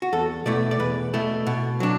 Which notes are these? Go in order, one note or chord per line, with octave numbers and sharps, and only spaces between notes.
F#4
E2 A4
B2 A3 E4 D5
D5
E2 B4
B2 A3 E4
B2
F#3 D4